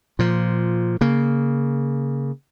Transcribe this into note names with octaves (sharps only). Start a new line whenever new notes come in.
A#2 F3
C#3 A#3